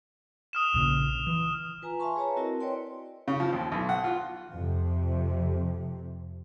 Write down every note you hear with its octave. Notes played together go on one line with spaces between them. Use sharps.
D#6 F6 E7
A#1 A#2 C#3
E3
F4 B4 G#5 A#5
E5 F5 G#5 A5 C6 C#6
G#4 B4 C#5 A5 A#5
C4 E4 F#4 A#4 D#5
B4 C#5 D5 G5 C6
C#3
F3
D#2
B1
F#5
F4
F2 C3